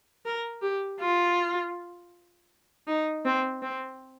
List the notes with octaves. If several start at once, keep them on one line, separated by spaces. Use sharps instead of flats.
A#4
G4
F4
D#4
C4
C4